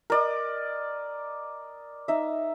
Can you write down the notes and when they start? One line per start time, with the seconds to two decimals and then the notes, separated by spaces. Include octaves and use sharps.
0.10 A#4 D5 D#5
2.08 D#4 E5